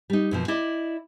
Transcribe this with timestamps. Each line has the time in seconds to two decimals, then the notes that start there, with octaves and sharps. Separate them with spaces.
0.10 G3 D#4
0.31 F#2 B2 F3
0.48 E4 D5 D#5